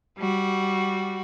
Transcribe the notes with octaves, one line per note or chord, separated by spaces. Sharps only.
G3 F#4